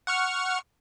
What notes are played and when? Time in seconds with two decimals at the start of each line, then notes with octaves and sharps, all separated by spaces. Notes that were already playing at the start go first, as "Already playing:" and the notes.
0.07 F#5 C#6 F6